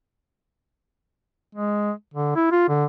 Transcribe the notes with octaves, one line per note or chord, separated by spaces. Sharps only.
G#3
D3
E4
F4
D3